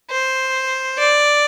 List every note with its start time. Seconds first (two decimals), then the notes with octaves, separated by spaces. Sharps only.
0.11 C5
0.99 D5